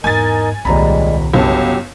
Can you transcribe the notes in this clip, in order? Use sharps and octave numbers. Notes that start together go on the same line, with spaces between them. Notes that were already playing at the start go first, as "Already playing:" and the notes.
E2 G#2 D#4 A#4 D#5 G#5 A6
D#1 C2 G3 G#3 A#3 A#5 B5
G1 C#2 F#3 B3 G4 A5